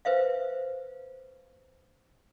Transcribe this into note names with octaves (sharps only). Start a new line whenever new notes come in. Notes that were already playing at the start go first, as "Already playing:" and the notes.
B4 C5 E5 F5